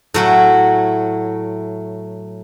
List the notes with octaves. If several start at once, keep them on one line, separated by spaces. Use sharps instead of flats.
A2 F#3 E4